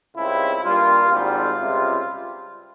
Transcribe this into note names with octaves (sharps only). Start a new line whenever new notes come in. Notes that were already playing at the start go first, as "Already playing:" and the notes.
C#2 C#3 G3 C4 E4
G2 G3 A#3 F4
G#1 G#2 G3 C4 F4
C#2 C3 G3